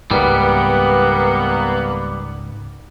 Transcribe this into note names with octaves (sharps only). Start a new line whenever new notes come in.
C#2 G#2 G3 A#3 B3